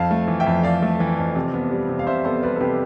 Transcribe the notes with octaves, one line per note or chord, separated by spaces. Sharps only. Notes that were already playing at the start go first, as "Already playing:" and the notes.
Already playing: F2 F5 A5
A3
E3
E5 G5
F2
F2 D5 F5
A3
E3
F2
C3
B3
G3
C3
F5
C3 C5 E5
B3 A4 C5
G3 B4 D5
A4
C3 G4 B4